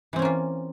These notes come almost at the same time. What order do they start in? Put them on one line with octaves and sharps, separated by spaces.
E3 C4 C#4 A#3 F4